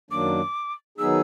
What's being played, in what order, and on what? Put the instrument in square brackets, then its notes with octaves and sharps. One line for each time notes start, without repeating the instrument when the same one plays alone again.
[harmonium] F#2 D#3 F#3 A#3 D4 [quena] D6
[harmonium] D#3 F#3 B3 D#4 G#4 [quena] E6